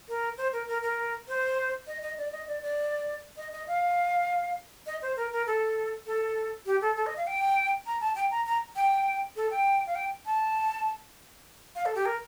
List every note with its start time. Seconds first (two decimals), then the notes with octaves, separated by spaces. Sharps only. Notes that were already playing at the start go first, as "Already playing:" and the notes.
0.08 A#4
0.38 C5
0.53 A#4
0.68 A#4
0.82 A#4
1.28 C5
1.87 D#5
2.02 D#5
2.18 D5
2.32 D#5
2.48 D5
2.62 D5
3.37 D#5
3.53 D#5
3.67 F5
4.86 D#5
5.02 C5
5.17 A#4
5.32 A#4
5.47 A4
6.07 A4
6.66 G4
6.81 A4
6.96 A4
7.06 D#5
7.17 F5
7.27 G5
7.86 A#5
8.01 A5
8.16 G5
8.31 A#5
8.46 A#5
8.76 G5
9.36 A4
9.51 G5
9.87 F5
9.95 G5
10.26 A5
11.75 F5
11.85 A4
11.95 G4
12.06 A#4